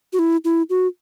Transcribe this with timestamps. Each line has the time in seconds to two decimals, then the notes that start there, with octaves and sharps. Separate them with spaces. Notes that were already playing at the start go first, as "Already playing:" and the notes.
0.13 F#4
0.19 E4
0.45 E4
0.70 F#4